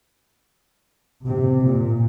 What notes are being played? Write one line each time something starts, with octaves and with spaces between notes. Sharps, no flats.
C3
A#2